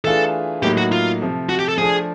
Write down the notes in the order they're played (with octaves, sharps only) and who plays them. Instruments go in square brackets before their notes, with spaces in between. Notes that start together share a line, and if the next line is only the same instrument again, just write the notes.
[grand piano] E3 A3 D4 F4 G#4 [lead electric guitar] A4
[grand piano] A2 F#3 A#3 D#4 [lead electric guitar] G4
[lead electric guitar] F#4
F4
[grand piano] C3 F3 A3
[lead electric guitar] F#4
G4
A4
[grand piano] F3 A3 D4 [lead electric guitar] G#4